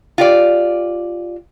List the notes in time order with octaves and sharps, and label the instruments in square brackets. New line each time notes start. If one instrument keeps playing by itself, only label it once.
[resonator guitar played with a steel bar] F4 G4 D5